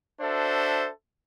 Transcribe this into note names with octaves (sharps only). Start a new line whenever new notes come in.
D4 F#4 A4 C5 E5